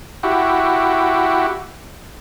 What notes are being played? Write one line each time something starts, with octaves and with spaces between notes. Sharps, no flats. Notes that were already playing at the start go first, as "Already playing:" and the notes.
E4 F#4 G4